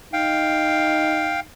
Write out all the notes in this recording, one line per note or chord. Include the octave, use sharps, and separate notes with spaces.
D#4 F5 G5